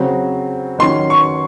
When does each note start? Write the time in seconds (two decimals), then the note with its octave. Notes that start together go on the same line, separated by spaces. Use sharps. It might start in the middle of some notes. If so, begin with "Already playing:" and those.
Already playing: C#3 F#3 C4
0.79 D#3 F#3 C#4 C6
1.10 C#6